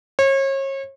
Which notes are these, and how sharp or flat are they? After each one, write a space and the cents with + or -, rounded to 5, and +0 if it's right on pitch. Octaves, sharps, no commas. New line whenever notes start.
C#5 -35